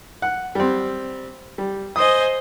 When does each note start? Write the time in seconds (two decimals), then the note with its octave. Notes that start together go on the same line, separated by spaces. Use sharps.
0.22 F#5
0.55 G3 C4
1.58 G3
1.96 C5 D#5 G#5 D#6